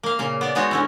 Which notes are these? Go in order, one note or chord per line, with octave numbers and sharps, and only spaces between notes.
A#3 F5
A#2 C#3 A#3
B3 D5
G#3 B3 D#4 F#4 C#5
D3 C#4 E4